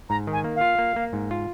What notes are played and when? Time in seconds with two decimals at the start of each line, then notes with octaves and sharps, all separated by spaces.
0.10 G#2 A#5
0.27 D#3
0.33 G#5
0.44 A#3
0.56 F5
0.61 F4
0.79 A#3
0.96 A#3
1.13 G#2
1.31 F4